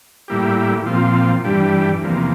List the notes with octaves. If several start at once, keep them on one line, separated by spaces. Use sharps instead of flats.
A2 G3 A#3 E4 G4
A#2 F3 C4 F4
G2 E3 G3 D4 G4
E2 C3 F3 A#3